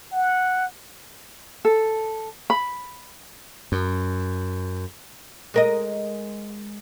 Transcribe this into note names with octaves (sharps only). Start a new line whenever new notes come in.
F#5
A4
B5
F#2
G#3 A#4 D#5